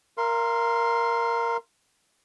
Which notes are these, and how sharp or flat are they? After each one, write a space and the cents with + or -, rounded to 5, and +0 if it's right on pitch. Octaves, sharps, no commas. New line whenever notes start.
A#4 +0 F5 -40 C6 +0